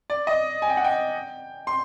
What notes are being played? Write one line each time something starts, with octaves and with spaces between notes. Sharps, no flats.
D5
D#5
G#5
G5
F#5
G5
C6